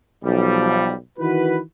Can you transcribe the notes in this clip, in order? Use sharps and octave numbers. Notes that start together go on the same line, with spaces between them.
B1 F3 G3
D#3 E3 F#4 B4